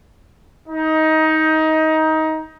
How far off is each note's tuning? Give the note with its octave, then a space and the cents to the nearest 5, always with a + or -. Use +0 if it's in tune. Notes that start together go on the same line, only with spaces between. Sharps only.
D#4 +20